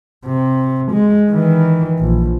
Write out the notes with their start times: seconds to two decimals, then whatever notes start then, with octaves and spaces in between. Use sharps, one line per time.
0.25 C3
0.92 G#3
1.30 D#3 E3
1.98 A#1